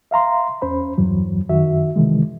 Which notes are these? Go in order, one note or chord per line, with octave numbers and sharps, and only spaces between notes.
E5 F5 A#5 C6
E2 C#4 C5 B5
E2 G2 E3 F#3
F#2 D#3 F#4 E5
C3 D#3 E3 G#3